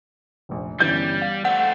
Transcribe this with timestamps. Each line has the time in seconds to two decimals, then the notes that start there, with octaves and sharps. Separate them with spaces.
0.49 F1 A#1
0.80 G1 E3 G3 C#4 G6
1.22 F5
1.45 A3 C4 F#5